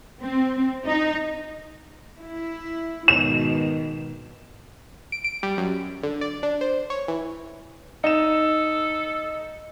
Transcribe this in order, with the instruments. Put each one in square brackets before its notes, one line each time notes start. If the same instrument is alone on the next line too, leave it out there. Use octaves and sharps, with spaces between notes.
[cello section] C4
D#4
E4
[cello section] G#2 B2 D#3 [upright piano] E7
[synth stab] D7
D7
G3
F#2
D3
D5
D4
C5
C#5
E3
[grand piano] D#4 E7 [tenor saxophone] A4